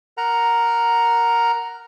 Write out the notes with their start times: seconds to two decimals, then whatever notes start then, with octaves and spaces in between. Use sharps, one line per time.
0.17 A#4 F#5 A#5